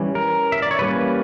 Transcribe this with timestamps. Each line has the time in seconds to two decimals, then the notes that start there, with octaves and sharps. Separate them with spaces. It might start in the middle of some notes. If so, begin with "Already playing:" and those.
Already playing: E3 G3 C#4
0.15 A#4
0.52 E5
0.62 D5
0.71 C#5
0.79 E3 G3 A#3 C#4 B4